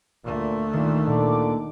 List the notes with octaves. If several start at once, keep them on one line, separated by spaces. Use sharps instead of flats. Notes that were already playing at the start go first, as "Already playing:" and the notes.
D2 A#2 A3
A#2 D#3
A#2 D3 D6